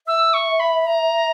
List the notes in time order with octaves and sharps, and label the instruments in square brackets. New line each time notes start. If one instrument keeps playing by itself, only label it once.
[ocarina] E5 [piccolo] E6
[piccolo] C#6
B5
A#5